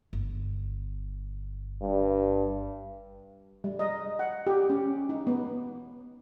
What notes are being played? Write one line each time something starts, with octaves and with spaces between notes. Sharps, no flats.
G1
G2
G3
D#5
F#5
G4
C#4
D#4
B3